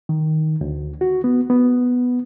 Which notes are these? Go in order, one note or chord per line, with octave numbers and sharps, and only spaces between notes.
D#3
D2
F#4
B3
B3